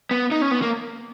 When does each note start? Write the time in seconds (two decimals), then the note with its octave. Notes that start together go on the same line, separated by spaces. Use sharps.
0.11 B3
0.32 D#4
0.42 C#4
0.51 B3
0.62 A#3